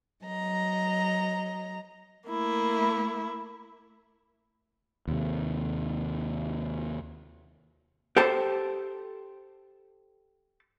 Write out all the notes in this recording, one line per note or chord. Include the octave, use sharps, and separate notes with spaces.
F#3 D#5 A#5
A3 A#3 E4
D#2 C3
G4 A4 C5 A5